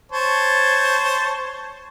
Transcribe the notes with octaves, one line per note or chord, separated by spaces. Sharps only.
C5 C#5 A5